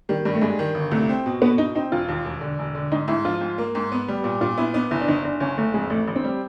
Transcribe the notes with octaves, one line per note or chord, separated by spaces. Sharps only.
D#3 G3
G2 G3
A3
G2 G#3
D#3
G1
C2 A3
C4
B2
B2 B3
B2 D#4
C4 D#4
E1 F4
D#2
E1
D3
E1
D3
G#2 D#4
G#2 E4
F3 F4
G#2
A#3
G#2
B3
G3
A#2
A#2 F4
B3 E4
B3 D#4
F#1 E4
D4
F#1 D#4
F#1 D4
F#1 C#4
F#1 A3
F2 G#3
A1 A3
A1
C4
G3